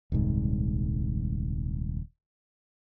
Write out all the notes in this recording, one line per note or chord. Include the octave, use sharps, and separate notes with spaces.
D#1 C2 G#2